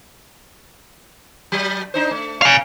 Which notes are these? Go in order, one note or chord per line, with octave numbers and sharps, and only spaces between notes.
F#3
D4 D#4 C5
A3
F5 G#5